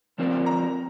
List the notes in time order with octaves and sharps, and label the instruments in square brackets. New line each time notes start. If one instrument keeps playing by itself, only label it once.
[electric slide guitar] F3 C4 F4 A#4 D5
[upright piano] A#5